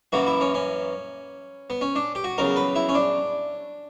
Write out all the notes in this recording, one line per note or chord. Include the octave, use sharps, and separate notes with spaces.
F#2 E3 A#3 F#4
E4
C#4
C#4
B3
C#4
D4
G4
F#4
E2 C#3 F#3 A#4
B4
E4
C#4
D4